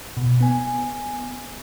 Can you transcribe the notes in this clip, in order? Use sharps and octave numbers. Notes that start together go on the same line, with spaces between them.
B2
B3 G#5